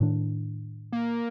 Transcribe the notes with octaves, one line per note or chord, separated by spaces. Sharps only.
A2 D#3 D4
A#3